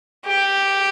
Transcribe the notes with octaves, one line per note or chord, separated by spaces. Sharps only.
G4